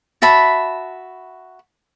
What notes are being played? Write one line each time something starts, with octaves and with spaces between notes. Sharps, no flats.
F#4 E5 A5 B5